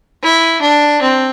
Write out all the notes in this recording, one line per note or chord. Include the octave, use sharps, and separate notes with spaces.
E4
D4
C4